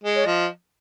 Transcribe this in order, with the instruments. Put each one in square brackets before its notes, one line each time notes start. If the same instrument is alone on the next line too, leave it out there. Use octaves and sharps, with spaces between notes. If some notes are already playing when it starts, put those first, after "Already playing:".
[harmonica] G#3
[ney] C#5
[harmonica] F3 [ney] D#5